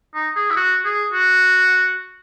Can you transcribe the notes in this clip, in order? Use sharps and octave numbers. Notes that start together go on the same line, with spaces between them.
D#4
G#4
E4
F#4
G#4
F#4